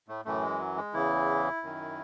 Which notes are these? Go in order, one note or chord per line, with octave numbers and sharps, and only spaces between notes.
A2 A3
F#2 A2 E3 A3
G#3
F#3
G#3
E2 C#3 E3 E4
F#2 D#3